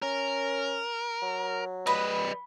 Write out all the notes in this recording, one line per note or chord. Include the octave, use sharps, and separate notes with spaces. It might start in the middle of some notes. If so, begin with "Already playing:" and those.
C#4 A#4
F#3
G3 B4 D#5